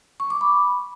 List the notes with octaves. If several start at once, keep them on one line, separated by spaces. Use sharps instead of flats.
C#6
D6
B5